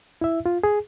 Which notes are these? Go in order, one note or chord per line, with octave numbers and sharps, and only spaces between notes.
E4 E5
F4
G#4